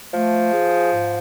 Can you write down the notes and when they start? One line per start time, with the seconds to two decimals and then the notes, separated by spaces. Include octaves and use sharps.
0.13 F3 A3
0.53 G#4
0.93 G#2